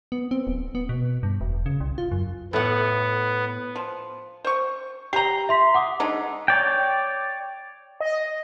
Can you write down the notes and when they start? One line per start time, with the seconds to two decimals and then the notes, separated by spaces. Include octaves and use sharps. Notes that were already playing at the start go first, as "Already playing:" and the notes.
0.12 B3
0.31 C4
0.47 D1
0.75 B3
0.89 B2
1.23 G2
1.41 E1
1.66 C#3
1.80 C2
1.98 F4
2.11 F#2
2.53 A2 B3 F#5
3.76 F3
4.44 C5 C#6
5.13 G4 A#5 C7 G7
5.49 E5 C6 B6
5.74 F#5 D6 D#6
6.00 D3 G#3 D#4
6.48 C#5 D5 G5
8.00 D#5